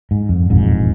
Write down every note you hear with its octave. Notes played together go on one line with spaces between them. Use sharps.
G#2
F2
E1 A#1 F2 G#2